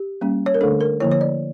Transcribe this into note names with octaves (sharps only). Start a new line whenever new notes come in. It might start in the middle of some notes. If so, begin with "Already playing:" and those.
Already playing: G4
G3 A#3 C#4
C#5
A#4
D3 A3 D4 A4
A#4
D3 F3 A#3 E4 C#5
C#5
D5